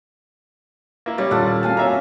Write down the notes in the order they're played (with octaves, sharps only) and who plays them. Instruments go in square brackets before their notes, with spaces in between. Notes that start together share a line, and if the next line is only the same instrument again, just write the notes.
[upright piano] A#3 E4
[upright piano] G3 C#4 [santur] D5
[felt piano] D#1 [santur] F4 A4 F#5
[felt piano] A#3 C4 F#4 [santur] F5 G#5 A5
[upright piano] C#4 E5 A#5